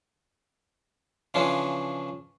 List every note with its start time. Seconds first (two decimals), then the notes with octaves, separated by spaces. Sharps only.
1.34 C#3 E3 F3 C#4 D4 F4